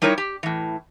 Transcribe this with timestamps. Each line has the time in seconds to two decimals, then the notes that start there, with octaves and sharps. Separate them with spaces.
0.02 G3 D#4 E4 A#4 C#5
0.18 G4
0.43 A2 E3